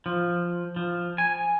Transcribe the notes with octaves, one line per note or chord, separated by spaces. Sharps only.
F3
F3
G#5